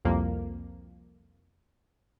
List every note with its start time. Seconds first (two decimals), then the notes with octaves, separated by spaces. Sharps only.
0.05 C2 F2 A#3